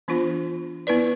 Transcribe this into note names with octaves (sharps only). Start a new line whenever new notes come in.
E3 B3 D4 F4 C5
B3 E4 B4 D5